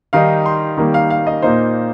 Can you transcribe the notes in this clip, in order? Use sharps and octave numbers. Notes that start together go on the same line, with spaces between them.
D#3 G3 D#4 F5
C6
D#3 G3 A#3
F5
F5
D#5
A#2 A#3 D#4 C5